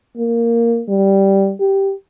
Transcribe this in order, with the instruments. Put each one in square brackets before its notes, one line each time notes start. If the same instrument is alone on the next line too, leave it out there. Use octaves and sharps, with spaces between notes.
[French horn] A#3
G3
G4